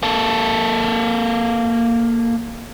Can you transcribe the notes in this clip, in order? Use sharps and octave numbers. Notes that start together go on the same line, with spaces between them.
A#3 A4